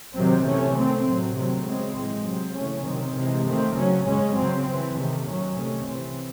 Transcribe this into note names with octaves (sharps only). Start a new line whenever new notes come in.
C3 D#3 F#3 C4
C3 E3 A3 C#4
D#3 A3 C4
A2 F#3 C4
C3 D#3 F#3 A3 C4
C#3 G#3 C4
A2 E3 G#3 C4
C3 F#3 C4
C#3 E3 A3 C#4
C3 D#3 F#3 C4
C3 E3 G#3
D#3 A3 C4
C#3 F#3 C#4
C#3 G#3 C#4
C#3 F#3 C4
E3 C4
C3 D#3 A3
D#3 F#3 C#4
C3 D#3 A3 C#4
C3 E3 C4